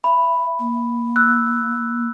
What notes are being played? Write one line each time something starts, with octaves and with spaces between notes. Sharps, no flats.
E5 B5
A#3
E6 F#6